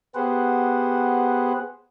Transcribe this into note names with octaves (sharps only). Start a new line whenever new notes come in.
B3 G4 G#4 B4 C5 F#5